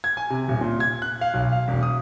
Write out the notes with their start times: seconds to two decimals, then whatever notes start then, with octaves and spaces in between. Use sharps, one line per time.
0.04 G#6
0.17 G#5
0.30 C3
0.48 D#1
0.61 A#2
0.80 G#6
1.02 F#6
1.21 F5
1.34 B1
1.53 F5
1.68 E1
1.83 D#6